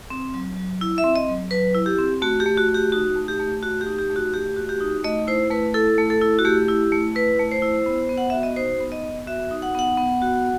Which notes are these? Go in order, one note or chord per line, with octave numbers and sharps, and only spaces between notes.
C4
F#3
F#3
E4
E5
C4
D#5
F#3
F#3 B4
E4
G4
C4
A3 F#4
G4
A3
F#4
F#4
G4
D#4 F#4
A3
G4
A3
F#4
G4
D#4
G4
A3
F#4
A3 G4
F#4
G4
D#4
A3 D#5
E4 C5
A3 B4
E4 A4
A3
A4
E4
F#4
A3 G4
E4
A3
E4 B4
A3
C5
E4
B3
B3
F#5
F#4 E5
D#5
D#4 C5
B3
D#5
B3
F#4 E5
D#4
F#5
B3 F#5
B3
F#4